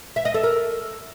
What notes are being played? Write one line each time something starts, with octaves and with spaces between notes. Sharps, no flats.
E5
D#5
A4
A#4